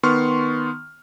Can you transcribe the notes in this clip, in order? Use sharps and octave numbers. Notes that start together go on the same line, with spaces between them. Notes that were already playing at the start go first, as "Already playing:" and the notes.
D#3 B3 C6 C#6 F6